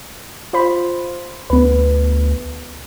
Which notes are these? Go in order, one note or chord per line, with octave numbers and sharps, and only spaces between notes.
F4 C5 B5
D2 B3 B4